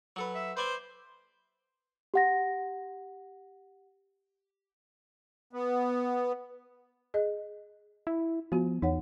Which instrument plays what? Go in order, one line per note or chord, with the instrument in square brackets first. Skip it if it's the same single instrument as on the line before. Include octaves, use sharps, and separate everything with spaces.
[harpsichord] F#3 A4 B4
[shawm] E5
[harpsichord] B4 D5 G#5 [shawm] C5
[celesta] G4 F#5 A#6
[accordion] B3
[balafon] G#4 D#5
[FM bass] E4
[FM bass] F3 [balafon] B3 F#4
[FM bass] E2 [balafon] D#4 C#5 F#5